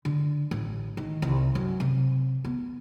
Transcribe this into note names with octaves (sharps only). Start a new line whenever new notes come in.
D3
A1
D#3
C2
F#2
C3
B3